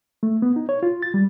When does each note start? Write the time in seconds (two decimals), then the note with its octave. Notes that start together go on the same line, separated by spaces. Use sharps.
0.23 A3
0.42 B3
0.56 D#4
0.69 C#5
0.83 F4
1.02 A6
1.14 G3